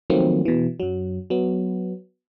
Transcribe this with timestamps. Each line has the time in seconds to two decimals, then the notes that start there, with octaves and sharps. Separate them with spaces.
0.10 D#3 F3 F#3 A3 A#3 C4
0.45 B2 E3
0.80 F#2 F#3
1.30 F#3 B3